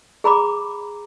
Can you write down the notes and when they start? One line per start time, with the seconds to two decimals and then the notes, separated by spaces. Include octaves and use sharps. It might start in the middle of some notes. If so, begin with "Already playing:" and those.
0.24 G#4 A#5 B5 D6